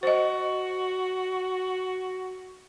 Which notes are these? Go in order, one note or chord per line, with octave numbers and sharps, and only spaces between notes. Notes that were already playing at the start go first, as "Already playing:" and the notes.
F#4 C5 D#5